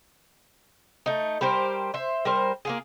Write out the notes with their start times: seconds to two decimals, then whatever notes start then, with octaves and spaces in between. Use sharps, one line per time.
1.06 A3 D#4
1.41 G3 G4 A#4 C5
1.94 C5 E5
2.25 G3 A#4 C5
2.65 A#3 F4 G#4